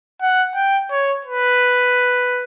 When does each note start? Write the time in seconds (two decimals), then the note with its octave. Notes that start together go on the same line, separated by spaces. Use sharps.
0.21 F#5
0.55 G5
0.91 C#5
1.25 B4